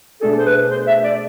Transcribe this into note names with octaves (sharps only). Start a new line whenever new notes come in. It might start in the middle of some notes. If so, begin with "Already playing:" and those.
B2 A3 D4 G#4 A4
C5
B4
C5
E5
D5